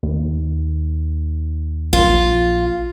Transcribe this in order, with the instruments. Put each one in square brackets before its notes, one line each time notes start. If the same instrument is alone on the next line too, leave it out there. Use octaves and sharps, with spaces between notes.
[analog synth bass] D#2
[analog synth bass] A#1 [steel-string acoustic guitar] F4